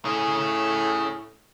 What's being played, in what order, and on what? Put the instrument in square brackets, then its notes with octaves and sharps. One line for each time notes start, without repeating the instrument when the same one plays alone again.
[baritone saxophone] A2 [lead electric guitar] C#4 G#4